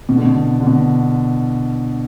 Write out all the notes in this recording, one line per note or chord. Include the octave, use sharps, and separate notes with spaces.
B2
D3
B2
D3
B2